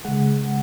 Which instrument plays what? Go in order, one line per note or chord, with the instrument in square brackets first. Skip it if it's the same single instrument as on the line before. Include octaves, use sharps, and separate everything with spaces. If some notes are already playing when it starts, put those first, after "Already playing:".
[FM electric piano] C#3 G#3 F#5